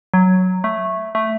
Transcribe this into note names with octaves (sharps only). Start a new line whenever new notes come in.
F#3
A3
A3